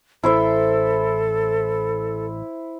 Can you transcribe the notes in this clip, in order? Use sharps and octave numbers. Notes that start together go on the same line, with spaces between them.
A1 E4 A4 C5 E5